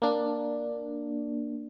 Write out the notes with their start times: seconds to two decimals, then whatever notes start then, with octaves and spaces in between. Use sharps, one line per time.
0.02 A#3 D4